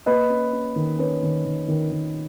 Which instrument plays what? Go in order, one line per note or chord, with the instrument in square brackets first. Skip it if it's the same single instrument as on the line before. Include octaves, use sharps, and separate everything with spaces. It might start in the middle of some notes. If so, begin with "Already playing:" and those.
[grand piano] A#3 B4 D#5
C#4
C#4
D#3
C#4 B4
D#3
D#3
D#3
D#3